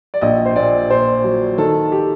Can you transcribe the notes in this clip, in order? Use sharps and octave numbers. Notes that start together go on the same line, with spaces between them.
D5
A#1 D#5
C5
A#2 D5
A#2 C5
F#3
D#3 A4
G4